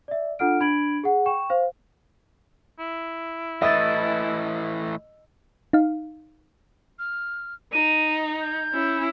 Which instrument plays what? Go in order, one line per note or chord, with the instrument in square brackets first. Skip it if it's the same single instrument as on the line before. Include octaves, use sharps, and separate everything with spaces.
[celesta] D5 E5
D4 F4 A4 F#5 F6 D7
D4 B5 G#6 D7 F#7
G#4 F#5
G5 C#6 E7
C5 F5
[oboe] E4
[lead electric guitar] A2 E3 [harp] D#5 A6 [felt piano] E5
[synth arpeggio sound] D#4 F5
[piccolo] F6
[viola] D#4 [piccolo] D#7
[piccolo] G6
[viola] C#4 E4